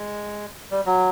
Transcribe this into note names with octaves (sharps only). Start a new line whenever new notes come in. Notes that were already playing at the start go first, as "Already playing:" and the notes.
Already playing: G#3
G3
F#3